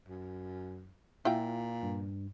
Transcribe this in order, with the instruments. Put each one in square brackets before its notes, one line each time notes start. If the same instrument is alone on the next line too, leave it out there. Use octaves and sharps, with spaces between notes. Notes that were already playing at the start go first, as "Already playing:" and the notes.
[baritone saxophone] F#2
[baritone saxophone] A#2 [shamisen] E4 F4 G5
[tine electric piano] G2